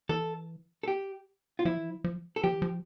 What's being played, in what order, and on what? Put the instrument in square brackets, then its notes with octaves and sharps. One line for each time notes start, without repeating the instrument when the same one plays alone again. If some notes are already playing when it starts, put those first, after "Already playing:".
[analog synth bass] E3 [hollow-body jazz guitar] A4
[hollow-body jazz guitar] A4
G4
F4
[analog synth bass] F3 [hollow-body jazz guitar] E4
[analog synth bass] E3
F3
F3
[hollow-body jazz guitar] A4
[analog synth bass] F3 [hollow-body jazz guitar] G4
[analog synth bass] E3
F3